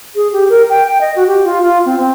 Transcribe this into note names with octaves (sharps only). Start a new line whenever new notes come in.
G#4
G4
A#4
G5
G5
D#5
F#4
G4
F4
F4
C4
C4